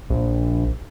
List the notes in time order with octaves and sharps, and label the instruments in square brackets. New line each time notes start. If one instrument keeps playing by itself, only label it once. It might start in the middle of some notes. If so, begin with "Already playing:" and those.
[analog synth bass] A#1